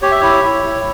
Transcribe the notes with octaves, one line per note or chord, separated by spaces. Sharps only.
G4 C#5
E5
E4 C#5
E4
E4